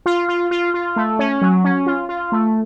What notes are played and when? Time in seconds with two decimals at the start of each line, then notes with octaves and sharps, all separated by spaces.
0.06 F4
0.29 F4
0.51 F4
0.74 F4
0.96 A3
1.19 C#4
1.42 F#3
1.64 C#4
1.86 F4
2.09 F4
2.32 A3